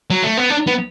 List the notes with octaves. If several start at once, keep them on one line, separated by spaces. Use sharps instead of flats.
F#3
A3
B3
D4
B3